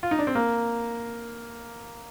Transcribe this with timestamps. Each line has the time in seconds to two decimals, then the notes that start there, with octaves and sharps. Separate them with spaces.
0.03 F4
0.11 D#4
0.19 D4
0.27 C4
0.35 A#3